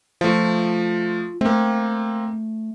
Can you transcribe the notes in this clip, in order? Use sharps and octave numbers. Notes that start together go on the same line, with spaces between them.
F3 A3 F4
A3 A#3 C4